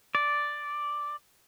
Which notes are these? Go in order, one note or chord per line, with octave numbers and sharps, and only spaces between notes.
D5